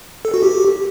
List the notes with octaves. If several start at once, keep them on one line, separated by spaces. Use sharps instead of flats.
A4
F#4
G4